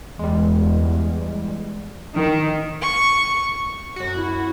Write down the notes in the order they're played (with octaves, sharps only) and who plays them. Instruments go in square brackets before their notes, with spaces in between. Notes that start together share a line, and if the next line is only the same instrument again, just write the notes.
[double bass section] E2 [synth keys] G3 G#3
[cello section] D#3
[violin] C#6
[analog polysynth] F#2 F#4
[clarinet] E4